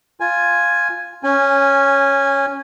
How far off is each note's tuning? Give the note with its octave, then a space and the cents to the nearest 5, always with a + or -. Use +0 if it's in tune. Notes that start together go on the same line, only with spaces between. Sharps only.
F4 +0 G#5 +0
C#4 +0 G#5 -15